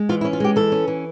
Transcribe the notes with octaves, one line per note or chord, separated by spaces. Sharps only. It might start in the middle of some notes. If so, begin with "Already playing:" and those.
Already playing: G#3
E3 F4
E4
C#4
F4
G#3 G4
E3 A4
C#4
E3